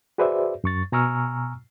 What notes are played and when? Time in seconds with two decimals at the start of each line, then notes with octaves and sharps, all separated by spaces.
0.18 F#4 G#4 B4 C5 D5 E5
0.64 F#2 C#6 A6
0.92 B2 G#5 A#5 C#6 E6 F6